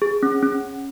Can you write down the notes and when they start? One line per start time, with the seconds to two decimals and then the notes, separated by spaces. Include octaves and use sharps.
0.02 G#4
0.23 C#4
0.42 C#4